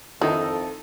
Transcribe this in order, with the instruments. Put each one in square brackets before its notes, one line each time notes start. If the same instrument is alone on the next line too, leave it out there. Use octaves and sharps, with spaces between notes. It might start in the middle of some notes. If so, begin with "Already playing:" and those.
[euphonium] F2 [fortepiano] D#3 D#4 [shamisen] E4 [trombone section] A4